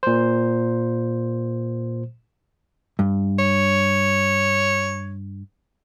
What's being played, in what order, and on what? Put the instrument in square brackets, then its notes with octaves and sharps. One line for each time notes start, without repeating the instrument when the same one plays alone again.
[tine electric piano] A#2 C5
[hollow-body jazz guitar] G2
[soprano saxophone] C#5